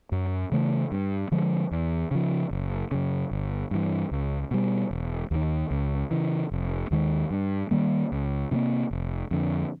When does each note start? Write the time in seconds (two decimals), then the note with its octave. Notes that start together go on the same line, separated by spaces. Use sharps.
0.12 F#2
0.52 C#3 E3 A3
0.92 G2
1.32 D3 F3 G#3
1.71 E2
2.11 C#3 F3
2.51 F#1
2.91 F#2 C#3
3.31 G1
3.71 G2 E3
4.11 C#2
4.51 B2 G3
4.91 E1
5.31 D#2 D#3
5.71 C#2
6.11 C#3 E3
6.52 F1
6.91 D#2 D#3 G#3
7.31 G2
7.71 D#3 G3 A#3
8.12 C#2
8.51 C3 F3 A#3
8.91 F1
9.31 F2 D3